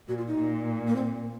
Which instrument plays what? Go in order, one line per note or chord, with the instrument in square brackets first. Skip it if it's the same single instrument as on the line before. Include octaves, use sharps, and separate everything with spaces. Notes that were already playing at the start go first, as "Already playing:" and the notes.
[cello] A#2 [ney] F#4
[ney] F4
D#4
[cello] A#2
[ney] A#3
C4